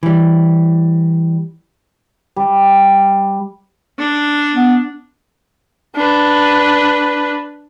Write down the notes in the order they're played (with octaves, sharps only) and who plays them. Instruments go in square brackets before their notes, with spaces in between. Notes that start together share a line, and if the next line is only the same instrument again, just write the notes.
[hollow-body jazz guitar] E3 G3
[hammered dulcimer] G3
[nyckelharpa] D4
[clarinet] B3
[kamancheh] D4 B4